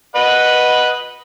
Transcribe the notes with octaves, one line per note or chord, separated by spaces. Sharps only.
B4 D#5 F#5